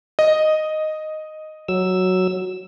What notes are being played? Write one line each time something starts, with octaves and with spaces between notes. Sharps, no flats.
D#5
F#3 E6